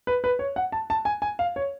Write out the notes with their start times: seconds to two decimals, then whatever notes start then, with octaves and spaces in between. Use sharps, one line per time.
0.07 B4
0.24 B4
0.39 C#5
0.56 F#5
0.72 A5
0.90 A5
1.05 G#5
1.22 G#5
1.39 F5
1.56 C#5